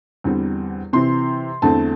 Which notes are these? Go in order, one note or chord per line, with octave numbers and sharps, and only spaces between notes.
E2 D3 G3 C4
C3 E3 C4 C6
E2 D3 A3 C4 A5